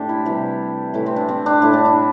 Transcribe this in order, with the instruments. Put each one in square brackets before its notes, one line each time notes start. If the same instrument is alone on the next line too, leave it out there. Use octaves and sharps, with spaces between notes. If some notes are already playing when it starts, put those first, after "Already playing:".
Already playing: [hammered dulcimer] A2 A3 D4 G4 A4 C5
E4
C3 E3 G3 G4
A2 E3 A3 E4
C4
D4
C4
D4
A2 A3 E4
D4
E4